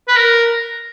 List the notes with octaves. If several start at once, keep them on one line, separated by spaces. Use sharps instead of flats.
B4
A#4